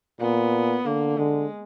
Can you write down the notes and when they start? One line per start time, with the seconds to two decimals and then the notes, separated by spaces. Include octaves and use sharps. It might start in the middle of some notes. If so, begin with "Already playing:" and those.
0.21 A#2 B3
0.85 D3 A#3
1.18 D3 G#3